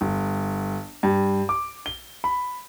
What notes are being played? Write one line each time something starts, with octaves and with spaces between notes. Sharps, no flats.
G1
G2
D6
G7
B5